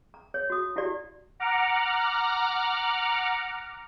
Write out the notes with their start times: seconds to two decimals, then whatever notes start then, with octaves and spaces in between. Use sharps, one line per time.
0.14 A#5
0.34 C#5
0.50 F#4 D#6
0.76 E4 F#4 G4 D5
1.40 F#5 A#5 D6 F6